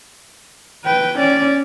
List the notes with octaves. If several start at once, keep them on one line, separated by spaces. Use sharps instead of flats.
B4 G5
C#4 D5